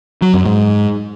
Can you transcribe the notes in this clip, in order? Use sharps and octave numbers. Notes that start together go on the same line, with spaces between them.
F#3
F#2
G#2